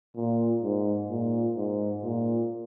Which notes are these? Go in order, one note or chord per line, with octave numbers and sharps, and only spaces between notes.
A#2
G#2
A#2
G#2
A#2